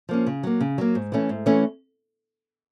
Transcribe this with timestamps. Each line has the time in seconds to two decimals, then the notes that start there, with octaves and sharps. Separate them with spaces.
0.09 F3 A#3 C#4
0.27 C#3
0.43 F#3 A#3
0.61 C#3
0.78 F#3 A#3
0.95 G#2
1.12 E3 A3 C#4
1.29 G#2
1.46 E3 A3 C#4